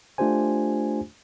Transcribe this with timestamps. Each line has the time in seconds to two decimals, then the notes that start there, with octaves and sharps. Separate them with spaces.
0.18 A3 D4 F4 G4 C5 G#5